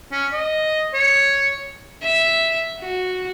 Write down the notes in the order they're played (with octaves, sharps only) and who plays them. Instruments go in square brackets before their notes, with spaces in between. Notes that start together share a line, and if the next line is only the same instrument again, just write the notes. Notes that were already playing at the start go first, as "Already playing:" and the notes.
[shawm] C#4
D#5
C#5
[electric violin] E5
F#4